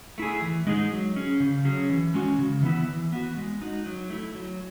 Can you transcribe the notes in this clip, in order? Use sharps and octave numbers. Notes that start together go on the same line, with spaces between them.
A3 E4 G#4
E3
G#3 D#4 G#4
F#3
C#4 G#4
C#3
F#3 C#4 G#4
E3
G#3 C#4 F#4
C#3
E3 B3 E4
E3
B3 F#4
G#3
D#4 F#4
F#3
A3 E4
F#3